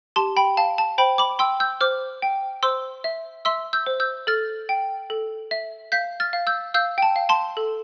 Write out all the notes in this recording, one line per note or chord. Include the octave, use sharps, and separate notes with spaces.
G4 A5 C6
G5 B5
F5 A5
A5
C5 G5 B5
B5 D6
G5 C6 E6
E6 G6
C5 D6 F6
G5
C5 C6 E6
E5
E5 C6 E6
E6 G6
C5
E6 G6
A4 F6 A6
G5
A4
E5
F5 G6 B6
F6 A6
F5
E6 G6
F5 E6 G6
G5
A5
F5
A5 C6
A4